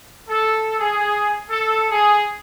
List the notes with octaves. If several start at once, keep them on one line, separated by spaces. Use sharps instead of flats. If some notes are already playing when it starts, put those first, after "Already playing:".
A4
G#4
A4
G#4